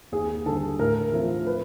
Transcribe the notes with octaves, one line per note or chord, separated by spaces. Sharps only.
D#2 G#4
D3 G3 A4
A2 A#4
F3 A3 C4
B4